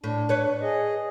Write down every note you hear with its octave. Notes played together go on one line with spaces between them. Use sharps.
A2 D4
B4 C#5
G#4 D#5